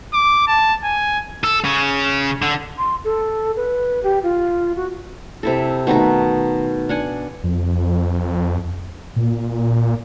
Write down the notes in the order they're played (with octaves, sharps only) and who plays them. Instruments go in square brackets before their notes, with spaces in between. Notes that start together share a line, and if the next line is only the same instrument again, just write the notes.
[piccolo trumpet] D6
A5
G#5
[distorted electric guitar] A4
C#3 C#4
D3
[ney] C6
A4
B4
G4
F4
F#4
[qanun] C3 E4 A4
B2 D#3 A3 A#5
D4 F#5 G#5
[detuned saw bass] F2
A#2